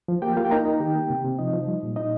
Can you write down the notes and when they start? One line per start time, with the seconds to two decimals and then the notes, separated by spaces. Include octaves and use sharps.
0.08 F3
0.22 A#3 G4 G5
0.37 A#3 F4 F5
0.45 G5
0.51 D#4 A#4 A#5
0.65 D#4
0.80 D#3 G4 G5
0.95 A#3
1.10 C3
1.25 C3
1.39 F3 D#4 D#5
1.53 F3
1.67 G3
1.83 A#2
1.96 D#4 D#5